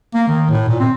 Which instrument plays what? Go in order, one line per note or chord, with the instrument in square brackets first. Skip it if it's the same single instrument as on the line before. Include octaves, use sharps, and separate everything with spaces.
[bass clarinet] A#3
D#3
A2
A#2
C4